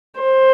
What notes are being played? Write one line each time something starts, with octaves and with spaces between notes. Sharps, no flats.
C5